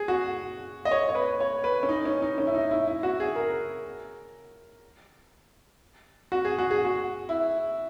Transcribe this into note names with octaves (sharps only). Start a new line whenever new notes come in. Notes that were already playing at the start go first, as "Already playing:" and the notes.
Already playing: G#4
F#4
D#5
C#5
C#5
B4
C#5
B4
C#4
D#4
C#4
D#4
C#4
E4
D#4
E4
E4
F#4
G#4
A#4
F#4
G#4
F#4
G#4
F#4
E4